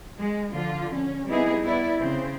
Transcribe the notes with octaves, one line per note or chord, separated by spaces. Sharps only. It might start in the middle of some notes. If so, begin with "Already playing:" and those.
G#3
D3 F3 F4
C#4
G3 B3 C4 D#4 E4 G#4
B3 E4 D5
C#3 C4 C5